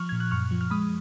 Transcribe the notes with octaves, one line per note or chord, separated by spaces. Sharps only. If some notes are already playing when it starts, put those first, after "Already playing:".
Already playing: F3 C#6 F6
A#2 G#6
F#6
F#2 C#6 F6
F3
F6
G#3 B5 D#6